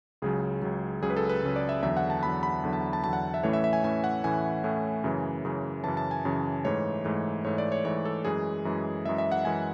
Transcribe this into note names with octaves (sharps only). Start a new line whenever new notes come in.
C#2 C#3 F#3 G#4
C#2 C#3 F#3
C#2 C#3 F#3 G#4
B4
A4
B4
C#2 C#3 F#3
D5
E5
E2 D3 F#3 E5
F#5
A5
E2 D3 F#3 B5
B5
E2 D3 F#3
A5
A5
E2 D3 F#3 A5
F#5
E5
A2 E3 A3 C#4 C#5
E5
E5
G#5
A2 E3 A3 C#4 G#5
F#5
A2 E3 A3 C#4 G#5
A2 E3 A3 C#4
F#2 C#3 E3
F#2 C#3 E3
F#2 C#3 E3 A5
A5
G#5
F#2 C#3 E3
G#2 E3 A3 C#5
G#2 E3 A3
G#2 E3 A3 C#5
D5
C#5
G#2 E3 A3 C#5
A4
F#2 E3 G#3 G#4
F#2 E3 G#3
F#2 E3 G#3 E5
E5
F#5
F#2 E3 G#3 G#5